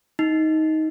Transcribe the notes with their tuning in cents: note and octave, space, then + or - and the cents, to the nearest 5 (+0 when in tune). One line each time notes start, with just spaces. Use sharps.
D#4 +15